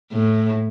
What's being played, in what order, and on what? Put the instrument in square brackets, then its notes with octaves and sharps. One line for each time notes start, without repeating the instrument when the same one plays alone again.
[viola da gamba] A2